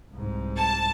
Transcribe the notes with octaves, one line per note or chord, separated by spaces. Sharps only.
C2 G#2
A5